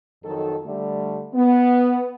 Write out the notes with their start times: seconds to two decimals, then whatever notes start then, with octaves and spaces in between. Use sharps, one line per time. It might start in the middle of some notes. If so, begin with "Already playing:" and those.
0.24 F2 D#3 F#3 A4
0.66 D3 G3 A3
1.34 B3